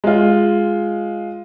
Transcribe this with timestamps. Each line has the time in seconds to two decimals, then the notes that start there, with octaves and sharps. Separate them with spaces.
0.04 G#3 F4